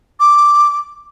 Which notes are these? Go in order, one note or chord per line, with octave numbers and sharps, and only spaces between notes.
D6